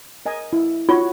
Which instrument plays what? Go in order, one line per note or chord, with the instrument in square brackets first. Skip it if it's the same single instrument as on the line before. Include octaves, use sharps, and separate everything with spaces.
[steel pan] A#4 D#5 G#5
E4
[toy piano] F4 [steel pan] F#4 C#5